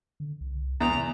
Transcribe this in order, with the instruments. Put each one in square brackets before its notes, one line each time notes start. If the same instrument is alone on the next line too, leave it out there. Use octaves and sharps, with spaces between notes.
[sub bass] D3
C2
[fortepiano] E2 [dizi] A#5
[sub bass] C3